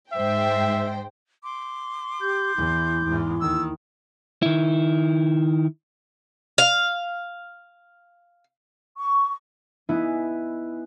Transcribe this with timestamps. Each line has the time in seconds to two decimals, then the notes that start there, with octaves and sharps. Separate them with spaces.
0.12 G#2 C5 E5 G5
1.43 C6 D6
2.21 G4 G6
2.56 E2 E4
3.05 E2 G#2
3.40 D#2 D#3 E6
4.42 D#3 E4
6.58 F5
8.98 C#6
9.89 B3 D#4 E4 G#5